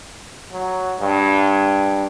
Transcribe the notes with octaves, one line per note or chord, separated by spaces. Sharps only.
F#3
G2